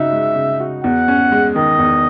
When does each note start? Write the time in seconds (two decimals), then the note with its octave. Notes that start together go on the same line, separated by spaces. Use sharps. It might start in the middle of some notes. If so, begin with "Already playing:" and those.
Already playing: C#3 D#4 F#4 E5
0.12 G#3
0.35 C#3
0.60 F#4
0.84 E2 F#5
1.08 C#4
1.32 G#3
1.55 D#3 D#5
1.79 E2